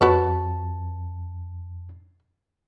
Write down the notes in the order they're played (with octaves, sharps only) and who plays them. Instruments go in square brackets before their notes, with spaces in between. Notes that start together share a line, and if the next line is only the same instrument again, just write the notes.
[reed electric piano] F2 A5 [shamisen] F#4 B4 C#5